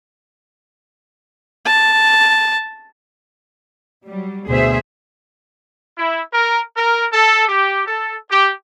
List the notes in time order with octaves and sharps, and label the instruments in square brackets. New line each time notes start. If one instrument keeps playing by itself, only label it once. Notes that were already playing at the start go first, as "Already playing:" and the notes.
[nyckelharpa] A5
[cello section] F#3 G3
[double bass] D2 B2 [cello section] G#4 C5 E5
[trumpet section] E4
A#4
A#4
A4
G4
A4
G4